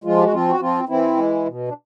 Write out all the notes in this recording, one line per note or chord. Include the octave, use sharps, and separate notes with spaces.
F3 G#3 F4
G4
F#4
F3 C4 F4
F#4
F3 C4 F4
E3 C4 E4
G#3
B2
D4